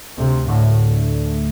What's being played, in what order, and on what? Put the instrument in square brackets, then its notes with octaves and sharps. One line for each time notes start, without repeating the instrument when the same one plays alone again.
[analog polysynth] D2 [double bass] C3
[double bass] A2 [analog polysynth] D3 A3